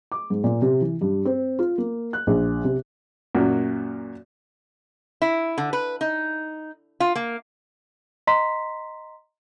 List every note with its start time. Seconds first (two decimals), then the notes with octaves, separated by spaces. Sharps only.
0.12 D6
0.30 G#2
0.44 A#2
0.62 C3
0.81 E3
1.01 G2
1.25 C4
1.59 F4
1.78 A#3
2.13 F#6
2.27 A#1
2.64 C3
3.35 F#2 A#2 F#3
5.22 E4
5.58 D3
5.73 B4
6.01 D#4
7.00 F4
7.15 A#3
8.27 D#5 A#5 C6 B6